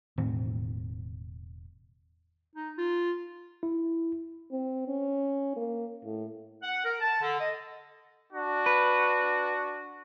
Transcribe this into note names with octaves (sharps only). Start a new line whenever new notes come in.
E1 A2 D#3 C4
D#4
F4
E4
C4
C#4
A#3
A2
F#5
A#4
A5
D3
D#5
D4 F#4
B4